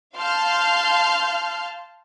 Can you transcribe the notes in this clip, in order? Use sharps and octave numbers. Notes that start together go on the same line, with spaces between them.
F5 A5 C6 F6 G6